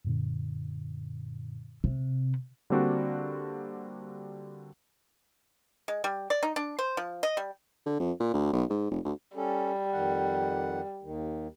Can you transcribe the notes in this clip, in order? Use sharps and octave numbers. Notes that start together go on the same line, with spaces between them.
F#2 A#2 D3
C3
D3 G3 A#3 C4 D4 F#4
G#3
G3
D5
D#4
D4
C5
F3
D#5
G3
D3
F2
A#2
D2
B1
G#2
F1
D2
G3 C#4 A4
F2 D#3 F#5
D#2 D#3